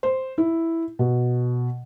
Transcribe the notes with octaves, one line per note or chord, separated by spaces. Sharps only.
C5
E4
B2